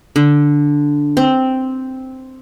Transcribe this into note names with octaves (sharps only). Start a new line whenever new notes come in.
D3
C4